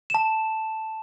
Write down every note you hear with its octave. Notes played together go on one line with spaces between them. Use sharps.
A5 E7